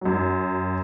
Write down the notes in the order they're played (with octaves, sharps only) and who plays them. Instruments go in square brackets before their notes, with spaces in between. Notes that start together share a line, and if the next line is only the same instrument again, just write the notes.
[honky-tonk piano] F#2 F#3